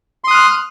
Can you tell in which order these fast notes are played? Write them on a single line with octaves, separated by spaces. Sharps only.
C6 D#6 F#6 F6